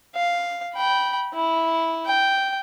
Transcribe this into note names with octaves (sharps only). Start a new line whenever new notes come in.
F5
G5 B5
E4
G5